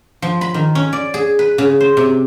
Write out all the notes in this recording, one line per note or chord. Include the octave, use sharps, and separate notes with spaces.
F3
B5
D#3
C#4
D5
G#4
B4
C#3
C5
C3